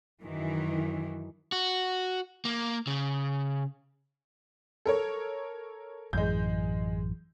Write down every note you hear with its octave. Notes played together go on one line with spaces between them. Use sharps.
F#2 D#3 E3
F#4
A#3
C#3
A4 A#4 C#5
A1 F#2 E3 G#3 G6